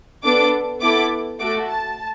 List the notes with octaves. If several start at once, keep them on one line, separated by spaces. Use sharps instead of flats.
B3 D4 A4 D6
B3 E4 A4 D6
A3 F#4 A4 D6
A5